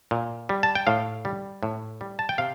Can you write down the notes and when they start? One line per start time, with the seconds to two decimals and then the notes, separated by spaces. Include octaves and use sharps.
0.11 A#2
0.49 G3
0.63 A5
0.75 G5
0.87 A2 F5
1.25 G3
1.63 A2
2.01 G3
2.19 A5
2.29 G5
2.38 C3 F5